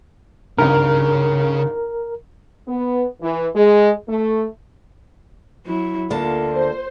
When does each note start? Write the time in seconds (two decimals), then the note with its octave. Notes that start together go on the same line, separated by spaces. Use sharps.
0.58 G#1 C#2 G2 C#3 A#4
2.68 B3
3.21 E3
3.55 G#3
4.08 A3
5.66 F#3 E4
6.10 D2 D3 A#3 F4 A5
6.53 C5